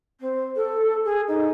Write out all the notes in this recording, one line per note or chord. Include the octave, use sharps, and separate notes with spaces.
C4
A4
G#4
D#4